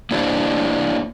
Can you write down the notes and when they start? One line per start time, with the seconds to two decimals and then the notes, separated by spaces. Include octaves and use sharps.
0.11 A#3 D4 E4 G4 C5